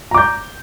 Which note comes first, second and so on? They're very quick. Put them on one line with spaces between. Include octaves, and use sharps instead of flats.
A#5 D6 G6